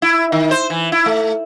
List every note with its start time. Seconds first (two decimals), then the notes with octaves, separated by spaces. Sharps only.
0.02 E4
0.32 D#3
0.51 C5
0.70 E3
0.92 E4
1.06 A3